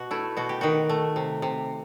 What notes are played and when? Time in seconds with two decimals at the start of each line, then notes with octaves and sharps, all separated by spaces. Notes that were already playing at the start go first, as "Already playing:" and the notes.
Already playing: B2 F#4
0.11 A3 E4
0.37 B2 F#4
0.49 G4
0.61 D#3 F#4
0.89 A3
1.16 C3
1.42 C3